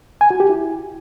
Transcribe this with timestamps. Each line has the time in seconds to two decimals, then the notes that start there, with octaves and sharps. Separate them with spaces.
0.21 G#5
0.30 F#4
0.40 G4
0.50 E4